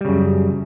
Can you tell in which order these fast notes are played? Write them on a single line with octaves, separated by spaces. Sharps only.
G3 C#3 F#2